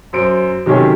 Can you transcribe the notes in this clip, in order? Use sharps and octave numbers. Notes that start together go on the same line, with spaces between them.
F#2 C5 D7
C3 D#3 F#3 C#4 G4 A4